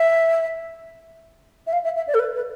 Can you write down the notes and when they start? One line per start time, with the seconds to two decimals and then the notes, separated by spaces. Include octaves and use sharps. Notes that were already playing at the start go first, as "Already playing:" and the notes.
Already playing: E5
1.67 E5
1.73 F5
1.84 E5
1.96 E5
2.07 D5
2.14 A4
2.19 B4
2.35 B4